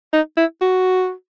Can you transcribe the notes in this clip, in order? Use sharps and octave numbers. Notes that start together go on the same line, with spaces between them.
D#4
E4
F#4